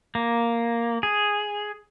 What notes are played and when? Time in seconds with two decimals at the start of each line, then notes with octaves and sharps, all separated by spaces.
0.15 A#3
1.03 G#4